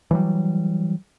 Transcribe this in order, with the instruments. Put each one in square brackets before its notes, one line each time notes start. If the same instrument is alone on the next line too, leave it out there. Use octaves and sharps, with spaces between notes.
[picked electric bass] E3 F#3 G3